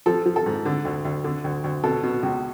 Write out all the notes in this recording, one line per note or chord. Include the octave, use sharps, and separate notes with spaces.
F3 A4
F3
A4
G#2
D3
D2
D2
D3
D2
D2
B2 A4
B2
C#2